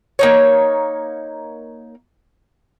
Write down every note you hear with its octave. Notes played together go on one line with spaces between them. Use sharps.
A#3 D#4 C#5